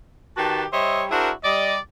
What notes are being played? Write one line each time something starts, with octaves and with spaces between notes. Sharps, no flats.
D#3 F#4 G4 B4 A5
G3 C5 C#5 D#5 E5
D4 E4 F#4 G#4 A#4 C5
G3 D5 D#5